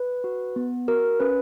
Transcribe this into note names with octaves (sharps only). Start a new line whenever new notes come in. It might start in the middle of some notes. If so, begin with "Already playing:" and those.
Already playing: B4
F#4
B3
F#4 A#4
C#4 B4